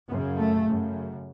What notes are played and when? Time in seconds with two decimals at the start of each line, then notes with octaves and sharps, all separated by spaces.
0.10 F#2 C#3 B3
0.38 A3
0.67 F#2 C#3